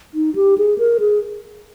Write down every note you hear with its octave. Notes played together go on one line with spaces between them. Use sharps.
D#4
G4
G#4
A#4
G#4